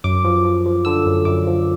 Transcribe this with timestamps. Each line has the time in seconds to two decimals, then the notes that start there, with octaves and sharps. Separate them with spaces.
0.04 F#2 D6
0.25 F3
0.44 F3
0.66 F3
0.85 D3 E6
1.06 F#2
1.25 F#2 D6
1.47 F3